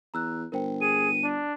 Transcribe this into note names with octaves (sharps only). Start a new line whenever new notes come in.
E2 A#5 E6 F#6
G1 A#4 C5 G5
G#4 D#7
D4